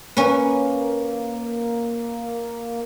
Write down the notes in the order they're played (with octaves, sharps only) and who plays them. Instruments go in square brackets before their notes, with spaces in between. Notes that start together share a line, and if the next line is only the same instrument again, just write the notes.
[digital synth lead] A#3 [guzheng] C#4 B4